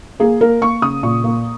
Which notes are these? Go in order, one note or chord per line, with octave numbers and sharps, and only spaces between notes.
A#3 G#4
A#3 A#4
A#3 C#6
C#3 D#6
A#2 C#6
A#3